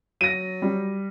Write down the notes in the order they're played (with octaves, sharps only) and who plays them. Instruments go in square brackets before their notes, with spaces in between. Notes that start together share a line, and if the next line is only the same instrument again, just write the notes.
[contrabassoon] F#3 [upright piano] A#6 D#7
[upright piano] G3